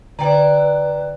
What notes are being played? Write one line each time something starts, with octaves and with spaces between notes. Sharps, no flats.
D3 E4 B4 D5 G5 A#5